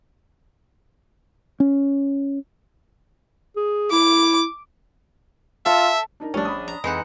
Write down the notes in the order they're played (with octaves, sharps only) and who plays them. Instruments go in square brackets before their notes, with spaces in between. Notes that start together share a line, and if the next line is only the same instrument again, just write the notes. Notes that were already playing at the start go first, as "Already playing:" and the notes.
[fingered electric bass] C#4
[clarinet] G#4
[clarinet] E4 [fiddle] D6
[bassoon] F4 [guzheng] A4 [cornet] E5
[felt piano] D4 D#4 A#4
[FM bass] A#1 [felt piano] A2 G3 [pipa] C#4 D4
[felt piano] B5 D#6
[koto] A#5
[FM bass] F2 [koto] E3 D#4 F#5 [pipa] G#3